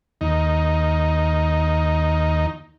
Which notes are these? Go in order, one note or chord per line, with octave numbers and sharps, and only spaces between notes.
D#2 D#4